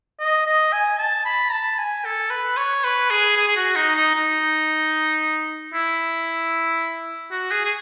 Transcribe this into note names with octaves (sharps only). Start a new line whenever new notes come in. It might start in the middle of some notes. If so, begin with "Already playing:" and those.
D#5
D#5
G#5
A5
B5
A5
G#5
A4
B4
C#5
B4
G#4
G#4
G#4
F#4
D#4
D#4
D#4
E4
F#4
G#4
G#4